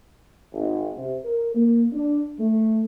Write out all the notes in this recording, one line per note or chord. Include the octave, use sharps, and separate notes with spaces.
G#1
C3
A#4
A#3
D4
A3